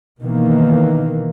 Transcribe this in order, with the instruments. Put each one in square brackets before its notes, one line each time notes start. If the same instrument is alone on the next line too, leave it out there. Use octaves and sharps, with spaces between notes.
[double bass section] B2 D#3 E3 A#3